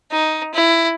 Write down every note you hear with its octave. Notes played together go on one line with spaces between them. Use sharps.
D#4
E4